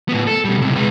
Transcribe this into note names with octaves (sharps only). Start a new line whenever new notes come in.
A2 B3
A4
B2 G3
C#2 C3
G#3 B4